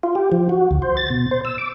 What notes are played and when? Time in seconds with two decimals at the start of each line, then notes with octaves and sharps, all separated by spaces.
0.03 F4
0.15 G4
0.32 F3
0.49 F#4
0.71 D2
0.82 C5
0.97 A6
1.10 B2
1.31 C5
1.45 E6
1.58 D6